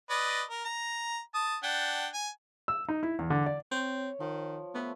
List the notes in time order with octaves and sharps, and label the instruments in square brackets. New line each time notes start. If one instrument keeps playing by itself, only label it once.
[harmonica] B4 D5 D#5
A#4
A#5
A5 D#6
D4 F#5 G5
G#5
[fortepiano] E6
D#4
E4
E2
D3
D5
[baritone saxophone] C4 [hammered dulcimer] C#5
[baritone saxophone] D#3 [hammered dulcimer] F3
[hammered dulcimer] A3 B4 C5 [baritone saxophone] B3